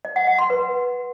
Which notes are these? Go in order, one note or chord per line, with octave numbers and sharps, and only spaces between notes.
D#5
F#5
F#5
C6
B4